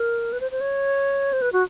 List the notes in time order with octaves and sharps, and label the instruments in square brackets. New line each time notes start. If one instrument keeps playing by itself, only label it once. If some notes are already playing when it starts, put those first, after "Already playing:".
Already playing: [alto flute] A#4
B4
C5
C5
C#5
C5
B4
F#4